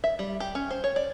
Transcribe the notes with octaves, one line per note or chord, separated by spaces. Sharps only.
E5
G3
G4
C#4
C5
C#5
D5